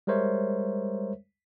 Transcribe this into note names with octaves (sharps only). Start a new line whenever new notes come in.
G3 G#3 A#4 C5 C#5 E5